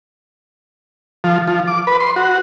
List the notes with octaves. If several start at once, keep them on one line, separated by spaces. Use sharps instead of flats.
F3
F3
D6
B4
C6
F#4